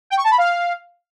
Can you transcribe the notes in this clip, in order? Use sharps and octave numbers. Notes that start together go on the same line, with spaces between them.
G5
C#6
A5
B5
F5